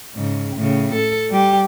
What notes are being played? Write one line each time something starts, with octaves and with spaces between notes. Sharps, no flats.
G#2 C#3
A2 C#3
A4
G3 G4